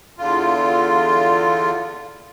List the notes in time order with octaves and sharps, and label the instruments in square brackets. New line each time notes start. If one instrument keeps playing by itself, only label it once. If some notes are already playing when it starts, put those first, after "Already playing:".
[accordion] E2 D3 F4